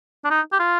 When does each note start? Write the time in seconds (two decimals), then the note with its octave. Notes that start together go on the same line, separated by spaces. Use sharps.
0.25 D4
0.30 D#4
0.52 G4
0.60 F4